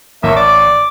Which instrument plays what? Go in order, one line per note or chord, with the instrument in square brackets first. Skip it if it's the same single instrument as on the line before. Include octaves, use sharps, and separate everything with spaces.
[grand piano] A1 C#6 [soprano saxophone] A#3 [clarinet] E5
[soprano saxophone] D5 [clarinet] D6